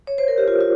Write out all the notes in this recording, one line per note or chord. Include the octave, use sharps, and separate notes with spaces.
C#5
C5
A#4
G4
F4
F4